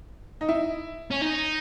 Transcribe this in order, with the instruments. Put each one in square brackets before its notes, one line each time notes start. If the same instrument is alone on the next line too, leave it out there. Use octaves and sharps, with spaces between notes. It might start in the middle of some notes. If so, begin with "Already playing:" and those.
[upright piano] D#4
E4
[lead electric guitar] C#4
D#4